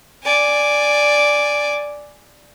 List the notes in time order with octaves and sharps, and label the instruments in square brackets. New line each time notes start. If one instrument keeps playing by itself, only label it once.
[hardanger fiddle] D5 G#5